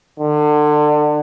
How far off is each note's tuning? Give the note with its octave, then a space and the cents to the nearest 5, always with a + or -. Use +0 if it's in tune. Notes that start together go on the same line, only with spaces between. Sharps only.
D3 +30